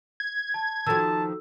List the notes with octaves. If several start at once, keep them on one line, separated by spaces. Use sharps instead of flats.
G#6
A5
D#3 F3 F#4 A4 A5 E6